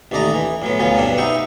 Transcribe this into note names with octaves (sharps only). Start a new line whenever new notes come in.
A1 D#2 A3 D5 D#5 A#5
E3
A2 F#3 B3
D2 F#3 B3 C#4 F4
B1 G2 B3 C4 D4
D#4 F#4 B4 E5 G5 C#6